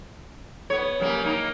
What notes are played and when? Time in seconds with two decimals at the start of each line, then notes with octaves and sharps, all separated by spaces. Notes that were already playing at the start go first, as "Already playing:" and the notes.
0.70 B3 C#5
1.00 C#3 G3 A#3
1.25 A#3 D#4